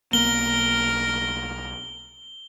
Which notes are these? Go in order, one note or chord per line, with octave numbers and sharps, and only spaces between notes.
B1 A#3 B3 A#4 G7